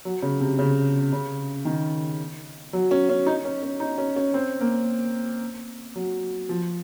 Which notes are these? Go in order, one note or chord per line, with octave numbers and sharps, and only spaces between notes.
F#3
C#3
C3
C#3
C#3
D#3
F#3
C#4
C#4
D#4
C#4
C#4
D#4
C#4
C#4
C4
A#3
F#3
F3